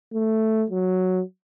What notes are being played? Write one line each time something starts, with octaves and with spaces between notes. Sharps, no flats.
A3
F#3